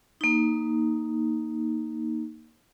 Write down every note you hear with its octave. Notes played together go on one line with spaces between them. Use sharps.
A#3 D#4